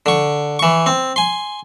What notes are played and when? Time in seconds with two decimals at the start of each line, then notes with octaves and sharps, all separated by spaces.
0.06 D3 C#6
0.59 E3 C#6
0.86 C4
1.16 G#5 C6